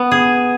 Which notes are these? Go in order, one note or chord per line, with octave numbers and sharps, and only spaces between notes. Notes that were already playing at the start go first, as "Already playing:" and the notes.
Already playing: B3
G#4